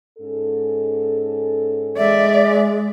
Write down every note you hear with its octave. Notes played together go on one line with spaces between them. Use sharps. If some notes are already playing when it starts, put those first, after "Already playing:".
G#2 C#4 A4
G#3 D5 E5